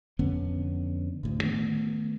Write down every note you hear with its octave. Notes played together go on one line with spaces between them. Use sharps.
F2 D3 B3 C#4
D2 A2
D#3 A3 B3